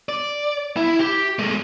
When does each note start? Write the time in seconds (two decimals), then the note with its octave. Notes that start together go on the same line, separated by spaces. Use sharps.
0.09 D5
0.77 E4
0.99 G4
1.39 G#3 A3